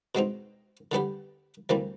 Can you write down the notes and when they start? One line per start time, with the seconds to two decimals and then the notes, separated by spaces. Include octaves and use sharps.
0.15 B2 G#3 C4 D#4
0.92 D3 G3 B3 D4 G4
1.69 D2 C3 E3 G3 A#3